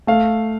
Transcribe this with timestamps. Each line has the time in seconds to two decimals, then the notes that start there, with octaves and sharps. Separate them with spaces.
0.07 A3 F5